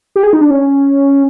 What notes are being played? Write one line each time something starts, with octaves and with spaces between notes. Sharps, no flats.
G4
G#4
D#4
D4
C#4